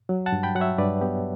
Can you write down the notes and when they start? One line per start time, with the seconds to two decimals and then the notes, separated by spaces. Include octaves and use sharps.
0.09 F#3
0.26 F#5 A5
0.32 G2
0.43 G5 B5
0.55 F#3 F#5
0.61 C#5 E5
0.78 G2 B4 D5
1.01 B3 G4